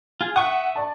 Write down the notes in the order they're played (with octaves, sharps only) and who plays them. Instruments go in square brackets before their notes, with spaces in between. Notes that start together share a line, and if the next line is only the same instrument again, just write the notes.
[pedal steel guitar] F4 G#4
[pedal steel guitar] E5 C#6 D#6 [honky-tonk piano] F#5
[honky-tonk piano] D5 A5